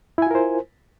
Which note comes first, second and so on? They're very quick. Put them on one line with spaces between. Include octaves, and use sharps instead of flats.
E4 G#5 F4 A#4 C5